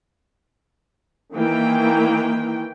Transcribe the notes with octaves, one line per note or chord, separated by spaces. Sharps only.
D#3 E3 A#3 G5